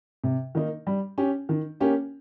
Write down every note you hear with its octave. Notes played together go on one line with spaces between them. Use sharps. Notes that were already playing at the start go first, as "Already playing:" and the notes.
C3
D#3 A#3 D#4
G3
C#4 G4
D#3
A#3 C#4 G4